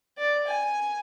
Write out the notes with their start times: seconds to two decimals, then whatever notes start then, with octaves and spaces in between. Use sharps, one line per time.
0.18 D5
0.47 G#5